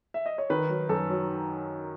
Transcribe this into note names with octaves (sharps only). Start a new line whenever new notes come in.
E5
D#5
C#5
D#3 B4
F#3
F#2 A4
F#3